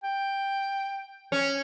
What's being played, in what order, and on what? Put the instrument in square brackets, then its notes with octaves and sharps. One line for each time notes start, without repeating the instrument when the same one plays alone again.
[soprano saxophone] G5
[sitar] C#4